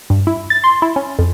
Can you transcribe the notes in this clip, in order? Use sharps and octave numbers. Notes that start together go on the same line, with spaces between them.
G2
E4
A6
C6
E4
C#4
F2